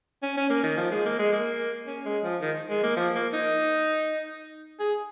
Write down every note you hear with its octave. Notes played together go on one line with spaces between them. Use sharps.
C#4
C#4
A#3
D#3
F3
G#3
A#3
G#3
A#3
C#4
G#3
F3
D#3
G#3
A#3
F3
A#3
D#4
G#4